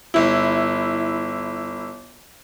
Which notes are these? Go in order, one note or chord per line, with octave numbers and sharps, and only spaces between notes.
G1 E4